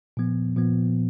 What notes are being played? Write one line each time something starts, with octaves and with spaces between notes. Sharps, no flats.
A#2 F3 B3
A#2 F3 B3